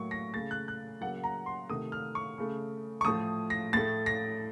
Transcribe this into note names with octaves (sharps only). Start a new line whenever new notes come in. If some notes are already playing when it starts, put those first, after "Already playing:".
Already playing: A2 F#3 A#3 C#6
A#6
C#3 A3 A6
F#6
F#6
C#3 F#3 A#3 F#5
A#5
C6
C3 D#3 A3 D#6
F6
C#6
C#3 A3
C#6
A2 F3 A3 D#6
A#6
A2 A3 A6
A#6